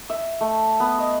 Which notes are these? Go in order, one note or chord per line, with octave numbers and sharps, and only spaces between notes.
E5
A3
B3
D#5